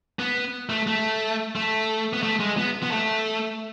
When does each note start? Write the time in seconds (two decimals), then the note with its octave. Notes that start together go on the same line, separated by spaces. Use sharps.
0.19 B3
0.69 A3
0.87 A3
1.56 A3
2.13 B3
2.23 A3
2.40 G#3
2.57 B3
2.83 B3
2.91 A3